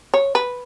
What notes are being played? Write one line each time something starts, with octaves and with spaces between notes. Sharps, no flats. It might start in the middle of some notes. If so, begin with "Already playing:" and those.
C#5
B4